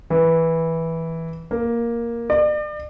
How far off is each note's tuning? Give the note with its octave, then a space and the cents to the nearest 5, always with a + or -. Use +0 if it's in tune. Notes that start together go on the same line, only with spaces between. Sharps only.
E3 -10
A#3 +5
D5 +40